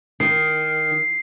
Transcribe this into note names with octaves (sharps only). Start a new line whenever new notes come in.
D#3 C7